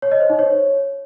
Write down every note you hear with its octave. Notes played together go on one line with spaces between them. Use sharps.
C#5
D#5
C5
D#4
C#5